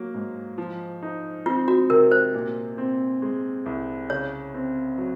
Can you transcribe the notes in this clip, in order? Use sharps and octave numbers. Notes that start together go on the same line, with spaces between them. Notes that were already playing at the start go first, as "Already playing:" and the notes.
Already playing: F#3 A#3
G#2
F3
D#4
C4 F4
F#4
C3 A#4
C5
A#2
C4
G#3
C2
C#3 C#5
C4
F#3